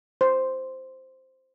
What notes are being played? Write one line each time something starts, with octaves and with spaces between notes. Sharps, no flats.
C5